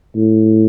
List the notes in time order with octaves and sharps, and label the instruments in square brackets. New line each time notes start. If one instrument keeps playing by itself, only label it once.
[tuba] A2